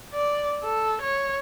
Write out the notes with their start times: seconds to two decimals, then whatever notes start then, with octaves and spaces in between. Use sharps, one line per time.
0.14 D5
0.63 A4
1.02 C#5